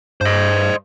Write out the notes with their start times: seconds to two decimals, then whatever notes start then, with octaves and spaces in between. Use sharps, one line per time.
0.21 G2 C5 D#5